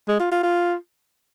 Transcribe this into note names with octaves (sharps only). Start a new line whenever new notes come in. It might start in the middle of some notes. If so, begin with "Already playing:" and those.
G#3
F4
F4
F4